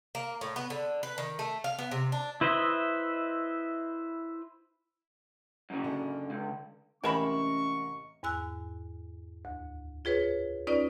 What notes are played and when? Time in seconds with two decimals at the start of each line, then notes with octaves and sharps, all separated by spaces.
0.15 A#3
0.41 A2
0.56 B3
0.70 D3
1.03 B4
1.18 D#3
1.39 A3
1.64 F5
1.79 B3
1.91 C3
2.12 D4
2.41 E4 B4 C5 D#5 E5
5.70 F#2 C#3
5.84 D3
6.30 C#2
7.04 A1 C3 G#3 C#4 A#4 B5 C#6 E7
8.23 E2 G#2 G#5 E6 F#6
9.45 D2
10.05 F4 G#4 B4 C#5
10.67 C#4 D#4 F4 B4 D5